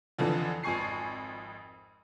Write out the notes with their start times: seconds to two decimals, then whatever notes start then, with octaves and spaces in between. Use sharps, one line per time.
0.18 F2 D3 E3 F3
0.63 G#1 F2 G#5 C#6 C7